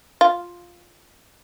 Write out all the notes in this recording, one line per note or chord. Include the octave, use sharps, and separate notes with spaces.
F4